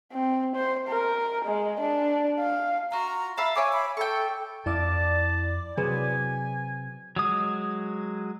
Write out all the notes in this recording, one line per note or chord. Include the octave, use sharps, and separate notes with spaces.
C4
C5
A#4
G#3
D4
F5
F4 F#4 A#5
E5 F5 A5 B5
E4 C#5 G#5 D6
B5
A4 G5 C#6
F2 E4 D5 A5 D6
C3 F#3 G#4 B4 G#5
F#3 G#3 D#6